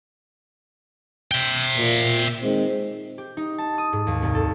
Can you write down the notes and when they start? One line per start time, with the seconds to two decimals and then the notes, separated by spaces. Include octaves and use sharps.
1.31 E5 G5
1.76 A#2
2.42 D#3 G#3 C4
3.18 G4
3.37 D#4
3.58 A5
3.78 D#6
3.93 G#2
4.07 D#2
4.22 C2
4.35 A4